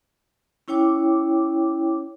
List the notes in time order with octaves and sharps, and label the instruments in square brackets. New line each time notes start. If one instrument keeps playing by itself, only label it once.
[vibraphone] C#4 E4 C#5 G5 D6